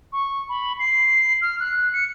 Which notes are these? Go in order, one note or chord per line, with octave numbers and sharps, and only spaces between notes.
C#6
B5
C7
F6
F#6
C#7